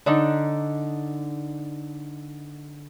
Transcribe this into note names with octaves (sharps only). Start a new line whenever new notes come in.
D3 D4 D#4